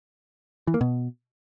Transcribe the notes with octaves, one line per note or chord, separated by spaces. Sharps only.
E3
A#3
B2